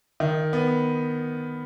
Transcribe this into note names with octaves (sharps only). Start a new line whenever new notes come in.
D#3
B3